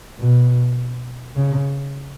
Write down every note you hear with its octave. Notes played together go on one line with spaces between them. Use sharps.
B2
C#3